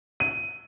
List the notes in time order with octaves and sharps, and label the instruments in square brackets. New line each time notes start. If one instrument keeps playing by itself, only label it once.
[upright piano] D#7